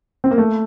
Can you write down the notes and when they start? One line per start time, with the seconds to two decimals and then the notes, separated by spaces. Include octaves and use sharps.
0.24 C4
0.31 A#3
0.38 A3